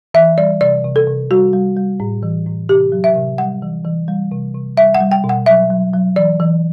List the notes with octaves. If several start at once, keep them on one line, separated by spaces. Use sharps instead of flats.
E3 E5
G3 D5
C3 D5
C3
A4
C3
G3 F#4
G3
G3
A2
E3
A2
C3 G4
F#3
E5
C3
G3 F#5
E3
E3
G3
C3
C3
G3 E5
F#5
G3
G5
B2
F#5
F#3 E5
F#3
F#3
E3 D5
E3